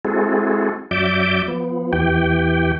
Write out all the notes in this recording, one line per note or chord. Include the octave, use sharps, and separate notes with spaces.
G#3 C4 E4 F#4 G#4 A4
F#2 F#3 D5 E5 D6 G6
F3 B3
E2 E3 G4 G5